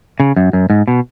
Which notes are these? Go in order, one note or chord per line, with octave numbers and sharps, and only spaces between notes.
C#3
F#2
F#2
G#2
B2